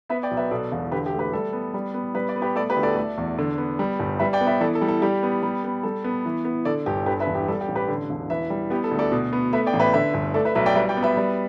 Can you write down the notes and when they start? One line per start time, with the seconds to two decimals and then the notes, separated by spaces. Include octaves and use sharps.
0.09 B3 B4 E5
0.23 D5 G5
0.31 B1
0.37 B4 E5
0.51 B2 A4 D5
0.72 E1
0.91 D3 G4 B4
1.06 G4
1.13 A3
1.19 G4 B4
1.33 G3 A4
1.53 B3
1.74 G3
1.94 B3
2.15 G3 B4
2.29 D5
2.36 B3
2.42 G4 B4
2.56 A3 A4 D5
2.70 G4 B4
2.77 D2
2.83 A4 D5
2.96 A3 A4 D5
3.18 E2
3.39 D3
3.58 B3
3.79 G3
3.99 G1
4.19 G3 B4 E5
4.33 D5 G5
4.41 B3
4.47 B4 E5
4.60 E3 A4 D5
4.75 A4
4.82 G3
4.88 A4
5.02 G3 G4
5.23 B3
5.43 G3
5.64 B3
5.83 G3 A4
6.04 B3
6.25 E3
6.45 B3
6.65 D3 A4 D5
6.86 G1 G4
7.06 D3 G4 B4
7.20 B4 E5
7.27 E1
7.35 G4
7.48 G3 A4
7.61 G4
7.68 A1
7.75 G4 B4
7.88 D3
8.10 E1
8.30 E3 B4 E5
8.50 G3
8.70 B3 G4
8.84 A4
8.91 D2
8.99 A4 D5
9.12 B2
9.33 B3
9.53 A3 B4 E5
9.66 D5 G5
9.73 A1
9.80 B4 E5
9.93 D3 B4 E5
10.14 G1
10.34 A3 A4 D5
10.45 B4 E5
10.55 B1 B4 E5
10.66 D5 G5
10.75 G3 B4 E5
10.89 D5 G5
10.97 B3
11.03 B4 E5
11.17 G3